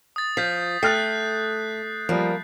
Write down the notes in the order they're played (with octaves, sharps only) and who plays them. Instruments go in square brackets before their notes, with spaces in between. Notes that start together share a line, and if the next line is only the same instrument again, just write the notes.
[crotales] D#6 A6
[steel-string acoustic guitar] F3 [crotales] G6 B6 C7
[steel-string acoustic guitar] A3 [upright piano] G5 F6 A6 [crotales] F#6 C7
[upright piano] F3 G3 [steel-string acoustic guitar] A#3